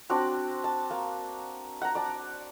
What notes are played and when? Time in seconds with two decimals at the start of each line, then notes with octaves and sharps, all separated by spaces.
0.10 C4 D4 F#4
0.64 A5
0.90 A#3
1.82 F#5 A#5
1.95 D5 A5